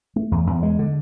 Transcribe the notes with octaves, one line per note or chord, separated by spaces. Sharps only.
A3
E2
E2
G#3
D3